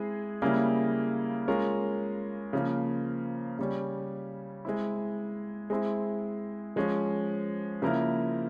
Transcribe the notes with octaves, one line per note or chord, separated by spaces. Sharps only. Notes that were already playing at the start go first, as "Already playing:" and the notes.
Already playing: G#3 C4 E4 G#4
C#3 G3 A#3 E4 G#4
G#3 C#4 F4 A#4
C#3 F3 A#3
C#3 G3 C#4
G#3 C4 E4
G#3 C4 E4
F3 G#3 C#4
C#3 F3 A#3 E4 A#4